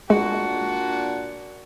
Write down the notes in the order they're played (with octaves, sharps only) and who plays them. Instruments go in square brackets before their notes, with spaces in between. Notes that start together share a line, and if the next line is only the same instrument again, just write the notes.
[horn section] A#2 D4 F#4 [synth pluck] G#3